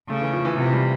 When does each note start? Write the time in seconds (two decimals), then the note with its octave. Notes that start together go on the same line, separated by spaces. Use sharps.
0.09 C#3 A3
0.22 E3
0.33 F3
0.45 E3
0.57 C3 F3
0.73 G3